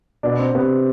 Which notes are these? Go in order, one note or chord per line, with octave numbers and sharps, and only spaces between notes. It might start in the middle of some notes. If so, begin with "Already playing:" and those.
B2 D4
C4
C3 B3